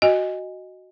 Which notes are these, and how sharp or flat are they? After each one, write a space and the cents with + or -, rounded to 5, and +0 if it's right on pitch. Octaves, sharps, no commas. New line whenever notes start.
F#4 +0 D#5 +0 G#5 -20